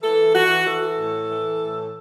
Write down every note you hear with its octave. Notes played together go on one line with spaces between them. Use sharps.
E3 A4
E3 F#4
E3 A4
A2
E3
A2